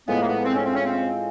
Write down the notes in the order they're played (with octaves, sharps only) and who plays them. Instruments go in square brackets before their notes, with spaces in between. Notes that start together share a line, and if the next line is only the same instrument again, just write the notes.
[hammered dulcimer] A2 F3 G#3 [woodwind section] B3
[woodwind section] A#3
B3
C4
C#4
C4
C#4
C4